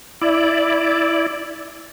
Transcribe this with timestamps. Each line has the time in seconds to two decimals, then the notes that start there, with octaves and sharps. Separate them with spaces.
0.22 E4 D5